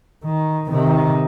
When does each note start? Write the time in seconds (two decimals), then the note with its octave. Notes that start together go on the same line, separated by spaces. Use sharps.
0.24 D#3
0.69 C3 D#3